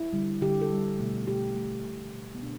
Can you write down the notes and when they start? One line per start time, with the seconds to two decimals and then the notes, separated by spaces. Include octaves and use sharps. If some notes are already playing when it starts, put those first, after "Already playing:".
Already playing: E4
0.13 D3 G3
0.41 D3 G3 G4
0.62 A4
0.70 D3 G3
0.99 B2 A3
1.28 B2 A3 G4
1.56 B2 A3
1.85 B2 A3
2.14 B2 A3
2.35 B3
2.42 B2 D4